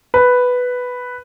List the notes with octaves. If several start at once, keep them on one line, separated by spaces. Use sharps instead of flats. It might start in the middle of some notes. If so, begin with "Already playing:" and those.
B4